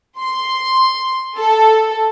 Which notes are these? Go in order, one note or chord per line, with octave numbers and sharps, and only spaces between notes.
C6
A4